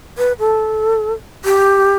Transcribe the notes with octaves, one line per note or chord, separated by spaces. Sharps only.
B4
A4
G4